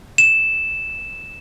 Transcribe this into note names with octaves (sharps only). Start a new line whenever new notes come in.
E7